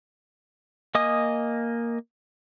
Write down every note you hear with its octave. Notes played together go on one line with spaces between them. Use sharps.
A#3 D#5 G#5 D#6